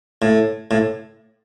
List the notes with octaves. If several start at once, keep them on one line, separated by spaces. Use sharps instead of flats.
A2
A2